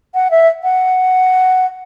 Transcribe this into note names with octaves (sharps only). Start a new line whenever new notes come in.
F#5
E5
F#5